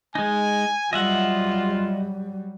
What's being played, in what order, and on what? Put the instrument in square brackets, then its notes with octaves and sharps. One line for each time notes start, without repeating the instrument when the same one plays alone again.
[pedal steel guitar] G#3 D#4 [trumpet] G#5
[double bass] F#3 G3 [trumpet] F4 [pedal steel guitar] D#5 E5 F#5